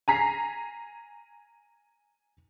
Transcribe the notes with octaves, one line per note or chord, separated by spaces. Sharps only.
G#5 A#5 B6 C7